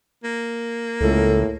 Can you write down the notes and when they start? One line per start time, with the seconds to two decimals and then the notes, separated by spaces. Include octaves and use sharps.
0.24 A#3
1.01 C#2 A2 A4